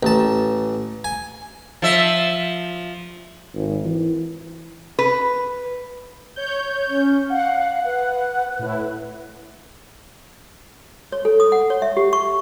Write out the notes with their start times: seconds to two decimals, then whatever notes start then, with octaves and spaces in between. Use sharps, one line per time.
0.03 A1 A5
1.04 G#5
1.82 F3 E5
3.54 G#1
3.85 E3
4.99 B4
6.36 C#5 G6
6.89 C#4
7.30 F5 F#5
7.85 B4
8.59 A2 E4
11.12 C#5
11.25 A4
11.40 D#6
11.52 F#5
11.70 C#5
11.82 E5
11.97 G4
12.13 C#6